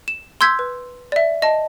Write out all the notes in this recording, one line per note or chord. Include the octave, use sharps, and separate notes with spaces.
E7
C6 E6 G6 G#6 B6
B4
D5 E5
D#5 A5